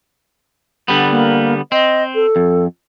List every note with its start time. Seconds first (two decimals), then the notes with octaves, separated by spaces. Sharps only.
0.88 D3 G3 B3
1.11 A#3
1.72 C4 D#5
2.15 A4
2.36 F2